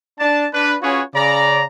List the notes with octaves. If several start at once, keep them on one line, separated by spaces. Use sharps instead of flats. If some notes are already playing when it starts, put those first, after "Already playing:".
D4 A5
D4 B4
C#4 F4 F#4 G#4 B4 C#5
C#3 D5 A#5